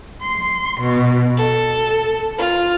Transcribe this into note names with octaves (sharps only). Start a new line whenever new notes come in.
C6
B2
A4
F4